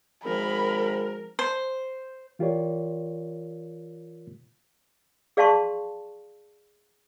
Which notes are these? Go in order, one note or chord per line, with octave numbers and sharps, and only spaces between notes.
G#1 F3 A#4 B5
C5
E3 F4 G4 A#4 C#5 D5
G#4 D5 F5 A5 C6 C#6